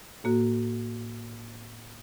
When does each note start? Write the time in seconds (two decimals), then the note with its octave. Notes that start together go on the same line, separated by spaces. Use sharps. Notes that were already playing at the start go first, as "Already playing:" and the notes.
0.24 A2 A#3 F#4